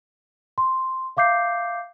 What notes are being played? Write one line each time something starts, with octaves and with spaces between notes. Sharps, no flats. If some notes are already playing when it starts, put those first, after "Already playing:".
C6
E5 F5 D6 G6 C7